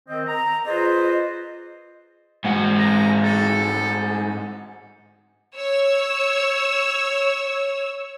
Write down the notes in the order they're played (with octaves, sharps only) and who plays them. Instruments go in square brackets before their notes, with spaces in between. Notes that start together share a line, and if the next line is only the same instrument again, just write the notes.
[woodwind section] D#3 C4 D#5
A#5
F4 G#4 B4 C5 D5 D#5
[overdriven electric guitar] G#2 F#4
[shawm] A#5
A4
[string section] C#5 E6